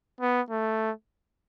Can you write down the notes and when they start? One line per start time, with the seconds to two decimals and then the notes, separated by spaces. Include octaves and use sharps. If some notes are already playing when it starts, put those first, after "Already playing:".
0.21 B3
0.50 A3